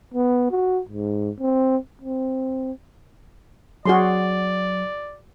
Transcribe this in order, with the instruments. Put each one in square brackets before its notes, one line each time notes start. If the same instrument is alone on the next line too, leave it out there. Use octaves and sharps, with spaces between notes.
[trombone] B3
F#4
G#2
C4
C4
[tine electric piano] F#3 [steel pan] F#4 G#4 C6 [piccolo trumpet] D5